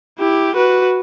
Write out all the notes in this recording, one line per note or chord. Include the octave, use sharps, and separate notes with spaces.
E4 G4
F#4 B4